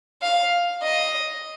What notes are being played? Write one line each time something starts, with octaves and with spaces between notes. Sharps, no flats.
F5
D#5